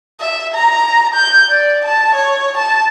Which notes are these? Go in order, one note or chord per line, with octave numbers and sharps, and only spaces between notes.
E5
A#5
G6
D5
A5
C#5
A5